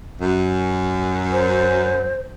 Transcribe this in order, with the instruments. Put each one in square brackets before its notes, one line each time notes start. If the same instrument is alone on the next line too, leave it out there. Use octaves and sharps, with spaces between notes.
[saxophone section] F#2
[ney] C5